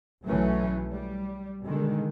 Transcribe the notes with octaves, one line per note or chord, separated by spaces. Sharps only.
B1 E3 F#3 A3 C#4
G3
B2 D3 D#3 G#3